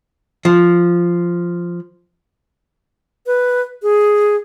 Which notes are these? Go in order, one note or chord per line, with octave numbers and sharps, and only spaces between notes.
F3
B4
G#4